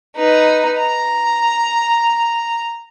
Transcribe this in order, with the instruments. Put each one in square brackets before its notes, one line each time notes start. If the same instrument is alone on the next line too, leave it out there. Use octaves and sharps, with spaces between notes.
[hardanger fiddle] D#4 B4
A#5